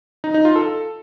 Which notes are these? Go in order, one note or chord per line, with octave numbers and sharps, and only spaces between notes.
D#4
D#4
F4
A4